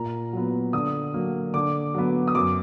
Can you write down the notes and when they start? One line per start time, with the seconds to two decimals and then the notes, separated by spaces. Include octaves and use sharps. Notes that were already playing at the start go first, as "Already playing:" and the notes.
Already playing: A#2 A#5
0.33 F#3 B3
0.73 D3 D#6
1.14 F#3 A#3
1.54 D3 D6
1.94 F#3 B3
2.28 D#6
2.35 F#2 D6